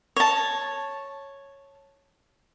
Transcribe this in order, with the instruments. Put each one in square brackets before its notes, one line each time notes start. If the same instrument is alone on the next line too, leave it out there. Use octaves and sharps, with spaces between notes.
[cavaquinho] C#5 A5